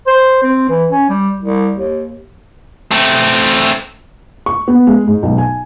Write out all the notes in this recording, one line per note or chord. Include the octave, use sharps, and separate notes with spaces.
C5
C4
E3
C#4
G3
C2
D#2
A3 C4
C#6
B3
G#3
G#2
B1
G#5